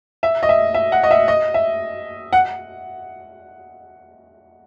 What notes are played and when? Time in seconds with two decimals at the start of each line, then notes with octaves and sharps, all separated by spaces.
0.23 E5
0.43 D#5
0.49 E5
0.74 E5
0.92 F#5
1.03 D#5
1.11 E5
1.28 D#5
1.54 E5
2.33 F#5